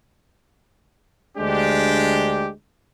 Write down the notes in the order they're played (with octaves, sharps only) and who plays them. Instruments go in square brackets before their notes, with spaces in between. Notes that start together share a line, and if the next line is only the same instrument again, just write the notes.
[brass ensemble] D2 G#3 D4 G4